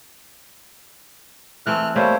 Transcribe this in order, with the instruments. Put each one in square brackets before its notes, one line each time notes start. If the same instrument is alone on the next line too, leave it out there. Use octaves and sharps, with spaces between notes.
[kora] E3 A3 C4 [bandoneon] F6 F#6
[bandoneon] G3 C5 C#5 [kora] A3 A#3 E5